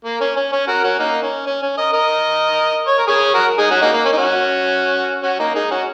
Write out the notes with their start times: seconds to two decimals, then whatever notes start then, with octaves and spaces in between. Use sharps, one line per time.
0.05 A#3
0.21 C#4
0.36 C#4
0.52 C#4
0.67 F#4 A#4
0.84 C#4 F#4
0.99 A#3 D#4
1.23 C#4
1.46 C#4
1.62 C#4
1.77 A#4 D#5
1.93 A#4 D#5
2.87 C#5
2.98 A#4
3.07 G#4 C#5
3.34 F#4 A#4
3.58 D#4 G#4
3.70 C#4 F#4
3.82 A#3 D#4
3.93 A#3
4.05 C#4
4.12 D#4
4.17 C#4 F#4
5.23 C#4 F#4
5.39 A#3 D#4
5.55 D#4 G#4
5.71 C#4 F#4